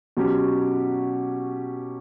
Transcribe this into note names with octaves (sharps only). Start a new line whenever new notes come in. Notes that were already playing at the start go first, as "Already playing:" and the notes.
B2 F#3 C#4 G4